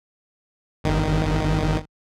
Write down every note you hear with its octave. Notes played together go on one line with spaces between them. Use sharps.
G1 D#3